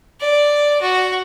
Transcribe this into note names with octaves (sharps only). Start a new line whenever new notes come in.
D5
F#4